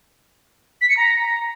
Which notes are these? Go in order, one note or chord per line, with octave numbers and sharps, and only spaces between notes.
B6
C#7
A#5